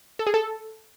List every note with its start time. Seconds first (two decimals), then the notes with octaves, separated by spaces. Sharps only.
0.19 A4
0.27 G#4
0.34 A4